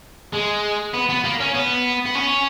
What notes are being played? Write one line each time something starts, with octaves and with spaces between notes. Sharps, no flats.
G#3
B3
B3
A#3
C#4
B3
B3
C#4